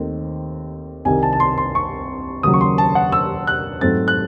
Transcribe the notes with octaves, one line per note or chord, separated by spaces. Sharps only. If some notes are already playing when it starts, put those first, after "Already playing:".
Already playing: D#2 D#3 A3 C4
C2 C3 D#3 G#5
A5
A5
C6
C6
C#6
D#2 C#3 F#3 D#6
C#6
C6
A5
F#5
E6
F#6
G#2 F#3 A3 C4 A6
F#6